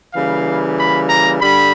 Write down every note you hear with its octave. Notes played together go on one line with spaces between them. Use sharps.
C#3 E3 G3 A#3 F5
B5
A#5
G2 D3 G3 B5